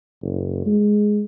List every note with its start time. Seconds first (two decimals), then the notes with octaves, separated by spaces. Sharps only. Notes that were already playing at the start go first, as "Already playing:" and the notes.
0.22 F#1
0.66 G#3